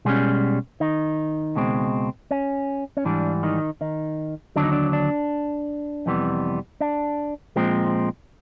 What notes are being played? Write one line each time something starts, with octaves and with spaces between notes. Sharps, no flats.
B2 G3 G#3 A#3 C#4 G#4
D#3 D#4
C#2 B2 G#3 C4
C#4
C#4
G#2 E3 G3 D4
D#3 D#4
D#3 D#4
D#2 D3 F#3 D4
D#4
D4
D4
F2 C3 E3 G3 B3
D4
A#2 F3 G#3 C4